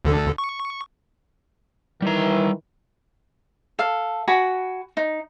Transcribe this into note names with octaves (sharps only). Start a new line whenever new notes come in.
D2 D3 A4
C#6
D#3 E3 G3 A#5
A4 F5
F#4 G#5 B5
D#4